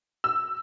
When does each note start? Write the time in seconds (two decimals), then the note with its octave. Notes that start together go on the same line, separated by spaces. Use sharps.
0.24 E6